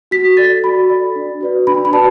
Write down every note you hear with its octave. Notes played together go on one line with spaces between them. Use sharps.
F#4 B6
A4 D5 A6
F#4 B5
A4 D5
D4
F#4 B4 D5
D4 B5
B5
F#4 B4 D5 A5